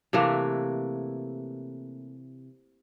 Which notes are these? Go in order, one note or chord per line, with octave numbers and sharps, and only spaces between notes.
C3 E3 A3 A#3